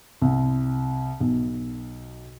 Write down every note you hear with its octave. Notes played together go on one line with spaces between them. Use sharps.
C2
B1